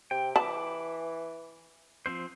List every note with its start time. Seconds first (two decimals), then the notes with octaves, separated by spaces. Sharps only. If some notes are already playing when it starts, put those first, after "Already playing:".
0.11 C3 G5
0.36 E3 A5 B5 D6
2.06 F3 C4 C5